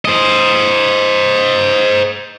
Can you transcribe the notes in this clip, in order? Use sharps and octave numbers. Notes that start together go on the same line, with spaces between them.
C5 D#5